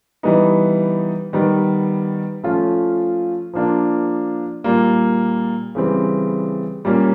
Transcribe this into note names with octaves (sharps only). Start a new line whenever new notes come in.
E3 G3 B3 D#4
D#3 G3 B3
F3 A3 C#4 F4
F3 A#3 D4 F4
A#2 G3 A#3
C#3 E3 G3 C4
A#2 G3 A#3 C#4